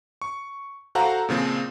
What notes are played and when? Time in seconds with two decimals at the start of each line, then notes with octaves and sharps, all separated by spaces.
0.22 C#6
0.95 F#4 A4 C5 F5 F#5 A#5
1.29 A#2 C#3 F3 C4